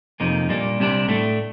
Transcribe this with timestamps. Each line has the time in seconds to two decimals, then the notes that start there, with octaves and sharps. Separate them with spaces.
0.20 F2 C3 F3 A#3 D#4
0.49 A#2 G3 A#3 D4
0.79 C2 C3 G3 D4
1.08 A2 A3 D4